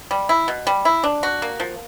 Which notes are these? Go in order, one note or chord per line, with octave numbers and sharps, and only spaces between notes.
G3
E4
B2
G3
E4
D4
F#4
A#3
F3